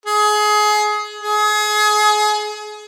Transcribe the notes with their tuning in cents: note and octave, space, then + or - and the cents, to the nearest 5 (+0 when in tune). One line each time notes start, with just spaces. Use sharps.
G#4 +25
G#4 +30